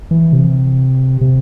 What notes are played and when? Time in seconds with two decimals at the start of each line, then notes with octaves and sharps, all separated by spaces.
0.11 E3
0.33 C3
1.21 C3